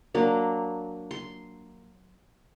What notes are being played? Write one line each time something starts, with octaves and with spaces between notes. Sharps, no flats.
F#3 A#3 D4
C6